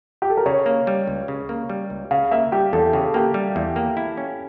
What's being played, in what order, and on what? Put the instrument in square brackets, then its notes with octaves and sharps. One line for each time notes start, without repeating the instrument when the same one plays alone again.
[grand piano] G4
A4
A#4
[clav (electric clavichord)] C#3 [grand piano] C#5
[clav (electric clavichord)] A#3
G3
C#2
C#3
A#3
G3
C#2
[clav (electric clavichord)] C#3 [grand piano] F5
[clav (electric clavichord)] A#3 [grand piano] E5
[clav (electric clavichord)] G3 [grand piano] G4
[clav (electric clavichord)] E2 [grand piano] A4
[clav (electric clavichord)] C#3 [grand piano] G4
[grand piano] A4
[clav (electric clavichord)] A#3 [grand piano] G4
[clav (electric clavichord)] G3
E2
A#3
E4
C#4